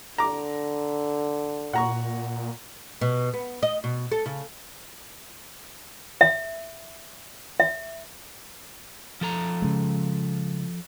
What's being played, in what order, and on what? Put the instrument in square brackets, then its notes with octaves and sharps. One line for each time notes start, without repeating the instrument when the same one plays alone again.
[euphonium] D3 [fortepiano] A#5 D6
[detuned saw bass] A#2 [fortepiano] F#5 A#5 C#6
[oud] B2
B3
D#5
B2
A4
C#3
[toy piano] E5
E5
[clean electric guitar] F3 A4 A#5
[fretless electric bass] C#3 G#3